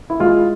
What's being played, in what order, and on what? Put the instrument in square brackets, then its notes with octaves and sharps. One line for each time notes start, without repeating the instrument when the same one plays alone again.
[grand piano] E4
G#3 F4